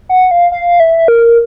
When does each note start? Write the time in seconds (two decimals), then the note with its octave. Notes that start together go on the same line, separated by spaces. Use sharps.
0.09 F#5
0.31 F5
0.52 F5
0.80 E5
1.08 A#4